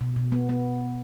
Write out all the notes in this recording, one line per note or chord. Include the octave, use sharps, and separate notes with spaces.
B2
B2
B3
B3